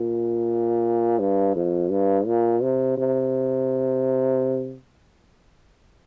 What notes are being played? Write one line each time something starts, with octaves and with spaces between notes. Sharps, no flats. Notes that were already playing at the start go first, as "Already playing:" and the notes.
Already playing: A#2
G2
F2
G2
A#2
C3
C3